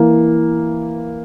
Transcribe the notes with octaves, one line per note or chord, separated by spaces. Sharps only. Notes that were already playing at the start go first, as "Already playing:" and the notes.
Already playing: E3 A#3